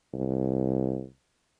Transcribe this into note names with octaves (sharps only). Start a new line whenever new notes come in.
C2